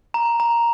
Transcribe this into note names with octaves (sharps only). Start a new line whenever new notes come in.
A#5
A#5